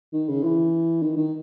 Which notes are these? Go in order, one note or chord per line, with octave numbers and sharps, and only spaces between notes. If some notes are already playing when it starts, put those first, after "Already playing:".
D#3
C#3
E3
D#3
D#3